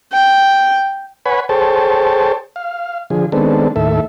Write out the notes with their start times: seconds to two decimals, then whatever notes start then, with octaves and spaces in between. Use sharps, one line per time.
0.13 G5
1.26 B4 C#5 F#5 G#5 B5
1.49 G#4 A4 C5 C#5 G5 A5
2.56 F5
3.10 D3 F3 G#4
3.32 D#3 G#3 B3 C4 D4 A4
3.76 D#2 A2 A4 E5